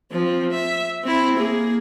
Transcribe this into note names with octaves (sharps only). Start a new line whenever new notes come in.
F3 C4
E5
C4 E4
A#3 G#4